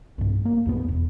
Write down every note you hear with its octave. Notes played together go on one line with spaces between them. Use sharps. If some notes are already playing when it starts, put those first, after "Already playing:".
B1 G2
A#3
B1 F2 B3
E1